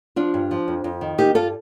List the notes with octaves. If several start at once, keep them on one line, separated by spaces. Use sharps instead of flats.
F3 D4 F4
G2
F3
F2
F2
D#3
A#3 D#4 G4
G2 F4 A4